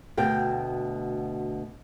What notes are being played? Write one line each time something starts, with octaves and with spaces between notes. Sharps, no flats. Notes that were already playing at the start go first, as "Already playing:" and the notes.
D2 B2 G5